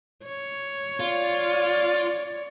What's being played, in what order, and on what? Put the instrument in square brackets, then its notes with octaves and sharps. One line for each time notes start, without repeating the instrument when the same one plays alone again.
[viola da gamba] C#5
[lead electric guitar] F4 [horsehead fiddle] D5